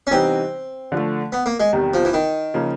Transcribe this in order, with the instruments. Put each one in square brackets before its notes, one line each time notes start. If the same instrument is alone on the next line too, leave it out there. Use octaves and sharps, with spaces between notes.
[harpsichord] C#4
[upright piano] C3 E3 G3 B3 D#4 [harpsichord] C4
[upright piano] D3 F3 A3
[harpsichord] B3
A#3
G#3
[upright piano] E2 C3 D#3 G3
[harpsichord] F3
E3
D#3
[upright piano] C#3 F3 A#3